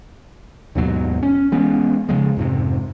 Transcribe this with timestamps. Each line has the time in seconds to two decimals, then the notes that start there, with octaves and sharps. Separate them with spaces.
0.75 D#2 G#2 B2 F#3
1.23 C#4
1.52 E3 G#3 B3 C#4
2.09 C#3 F3 G#3
2.37 F2 G#2 C3